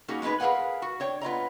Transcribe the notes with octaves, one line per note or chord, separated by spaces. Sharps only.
G3 A#3 C#4 D#4 F#4 G#4
G#3 B3 D#4 G#4 B4
G#4 A#4 B4 F5 F#5 G#5
F#4
D4 C#5 G5
B3 F4 D#5 A#5